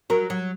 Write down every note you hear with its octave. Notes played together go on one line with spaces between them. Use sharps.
F#3 A#4
F#3